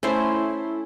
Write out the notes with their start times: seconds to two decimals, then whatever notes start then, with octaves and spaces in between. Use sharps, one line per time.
0.03 A3 C#4 E4 C5